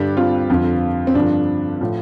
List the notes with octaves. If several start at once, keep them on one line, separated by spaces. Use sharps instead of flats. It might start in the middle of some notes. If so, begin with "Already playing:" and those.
Already playing: G2 D3 G3 D4 G4
C4 F4
F2 D3 F3
C4
G2 D3 F3 D4
A2 F3